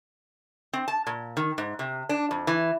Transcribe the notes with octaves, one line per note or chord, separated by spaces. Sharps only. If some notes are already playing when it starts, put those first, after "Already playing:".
C4
A5
A#2
D#3
G#2
C3
D4
F2
E3